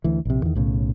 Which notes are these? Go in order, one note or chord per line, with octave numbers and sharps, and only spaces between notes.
D2 E3
A#1 C3
E2 D#3
B1 A2 C#3